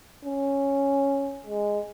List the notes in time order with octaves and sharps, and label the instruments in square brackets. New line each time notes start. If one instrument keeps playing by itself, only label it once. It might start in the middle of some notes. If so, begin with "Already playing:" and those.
[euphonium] C#4
G#3